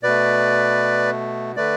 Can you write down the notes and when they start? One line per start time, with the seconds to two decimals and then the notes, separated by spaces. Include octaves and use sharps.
0.03 B2 A3 B4 D5
1.56 D3 A3 B4 D5